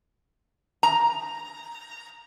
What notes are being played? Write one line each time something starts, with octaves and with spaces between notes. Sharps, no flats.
A#5